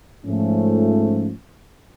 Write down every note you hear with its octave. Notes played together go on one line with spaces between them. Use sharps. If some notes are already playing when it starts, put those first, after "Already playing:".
G#2 F3 A3 C#4